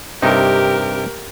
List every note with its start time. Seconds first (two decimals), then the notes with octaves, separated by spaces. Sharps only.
0.22 G2 C3 D#4 G4 A#4